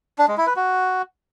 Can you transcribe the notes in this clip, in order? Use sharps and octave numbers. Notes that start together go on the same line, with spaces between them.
D4
G#3
E4
B4
F#4